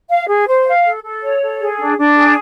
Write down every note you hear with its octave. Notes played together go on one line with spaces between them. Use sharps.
F5
G#4
C5
F5
A4
A4
C#5
A4
G#4
D4
D4
G#4